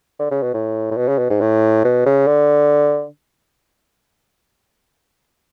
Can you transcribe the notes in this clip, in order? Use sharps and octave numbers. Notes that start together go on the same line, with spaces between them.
D3
C#3
B2
A2
A2
B2
C#3
B2
G#2
A2
B2
C#3
D3